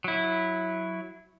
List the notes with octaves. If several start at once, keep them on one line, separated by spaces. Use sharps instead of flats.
F#3 E4